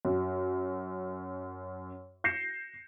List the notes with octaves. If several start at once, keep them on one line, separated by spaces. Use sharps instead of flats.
F#2
G6 A#6 C7 C#7 E7